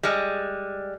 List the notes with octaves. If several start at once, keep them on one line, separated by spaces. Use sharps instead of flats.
G3 G#3